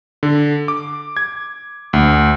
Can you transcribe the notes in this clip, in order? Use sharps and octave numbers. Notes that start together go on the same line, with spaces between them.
D3
D6
G#6
D2